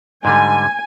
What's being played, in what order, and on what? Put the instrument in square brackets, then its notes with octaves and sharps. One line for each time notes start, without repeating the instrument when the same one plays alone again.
[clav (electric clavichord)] G#2 D3 G3 [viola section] G#5